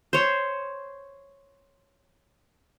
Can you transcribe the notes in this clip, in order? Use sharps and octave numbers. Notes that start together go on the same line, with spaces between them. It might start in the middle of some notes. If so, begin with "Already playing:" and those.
C5 C#5